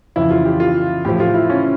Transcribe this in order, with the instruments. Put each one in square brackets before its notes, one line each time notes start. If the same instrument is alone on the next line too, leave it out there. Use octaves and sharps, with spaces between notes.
[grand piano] F2 C#3 E3 E4
F4
G4
F4
A2 F3 G4
F4
E4
C#4